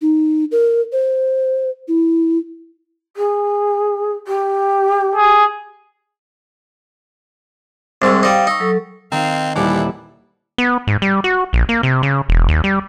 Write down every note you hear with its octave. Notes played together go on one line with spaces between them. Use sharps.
D#4
A#4
C5
E4
G#4
G4
G#4
C2 G#2 G3 E6
G3 D#4 C5 F5 G5
D#4 C#6 E6
F#3 A4
D#3 C4 F5
D#1 D#2 E3 G3 E4 D6
B3
G#2
G3
F#4
A#1
A#3
C3
C#3
E1
D#2
G3